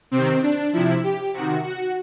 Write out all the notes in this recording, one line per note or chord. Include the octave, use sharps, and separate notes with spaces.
C3 C4
D#3
D4
C3 F3 E4
G4
C3 D#3 F#4
F#4